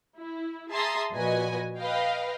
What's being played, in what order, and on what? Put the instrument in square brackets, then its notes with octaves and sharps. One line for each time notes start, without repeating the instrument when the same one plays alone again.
[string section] E4
G#4 E5 A5 A#5 C6 D#6
A#2 F3 F#4 B4 D#5 G#5
B4 D#5 F5 G5